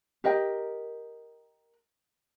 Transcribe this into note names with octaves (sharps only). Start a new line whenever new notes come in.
G4 A#4 D#5 G5